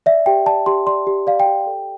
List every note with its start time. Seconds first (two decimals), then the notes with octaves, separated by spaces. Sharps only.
0.06 D5 E5
0.26 G4 G5
0.46 D5 A5
0.66 G4 C6
0.87 D5 C6
1.07 G4
1.27 D5 F5
1.40 G5
1.46 G4
1.66 A4